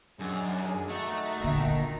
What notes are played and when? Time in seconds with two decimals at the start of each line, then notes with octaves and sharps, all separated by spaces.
0.19 F#2 D#3 D4 G#4
0.89 A3 D#4 F#4
1.40 G#1 A#2 D3 D#3